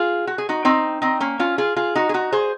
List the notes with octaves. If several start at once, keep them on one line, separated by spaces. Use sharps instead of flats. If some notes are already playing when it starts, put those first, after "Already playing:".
Already playing: F4 G#4
F#4
G#4
D#4 F#4
C4 D#4
C4 D#4
A#3 C#4
C#4 F4
F4 G#4
F4 G#4
D#4 F#4
G#4
D#4 F#4
G#4 C5